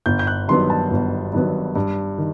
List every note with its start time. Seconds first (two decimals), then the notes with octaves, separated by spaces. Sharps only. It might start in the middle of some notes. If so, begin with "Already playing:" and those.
0.06 G1 G6
0.19 G6
0.27 F#6
0.48 G2 D#3 F#3 B3 C6
0.70 A5
0.91 G1
1.33 G2 D#3 F#3 B3
1.76 G2
2.18 D#3